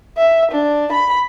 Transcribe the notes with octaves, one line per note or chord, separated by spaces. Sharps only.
E5
D4
B5